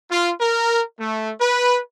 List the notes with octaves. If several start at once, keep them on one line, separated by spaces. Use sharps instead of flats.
F4
A#4
A3
B4